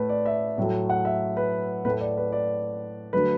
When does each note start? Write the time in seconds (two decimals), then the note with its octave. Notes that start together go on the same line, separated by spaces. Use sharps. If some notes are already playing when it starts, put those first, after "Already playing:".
Already playing: A2 A3 B4
0.09 D5
0.26 E5
0.58 A2 F#3 A3
0.90 F#5
1.05 E5
1.37 B4
1.85 A2 A3 B4
2.01 D5
2.17 B4
2.32 D5
3.13 D3 F#3 A3 B4